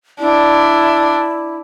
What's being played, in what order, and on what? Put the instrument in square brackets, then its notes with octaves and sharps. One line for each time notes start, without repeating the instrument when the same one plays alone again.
[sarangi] D4 [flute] E4